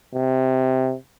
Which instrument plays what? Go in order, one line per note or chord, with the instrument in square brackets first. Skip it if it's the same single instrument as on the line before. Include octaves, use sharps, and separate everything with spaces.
[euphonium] C3